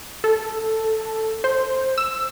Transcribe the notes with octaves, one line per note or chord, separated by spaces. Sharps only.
A4
C5
E6